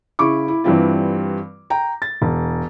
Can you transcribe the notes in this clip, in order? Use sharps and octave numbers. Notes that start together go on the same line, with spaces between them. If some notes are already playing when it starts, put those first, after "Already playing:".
C#3 E4 C#6 D6
E4
G2 E3 G3 C4 E4 F4
G5 A#5
A6
E1